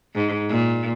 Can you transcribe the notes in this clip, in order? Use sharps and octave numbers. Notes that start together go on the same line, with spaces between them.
G#2
A#2